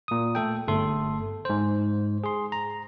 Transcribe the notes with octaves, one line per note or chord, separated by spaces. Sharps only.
A#2 D#6
A3 A4 G5
G1 A3 A4 C6
G#2 C5
G#4 C6
A#5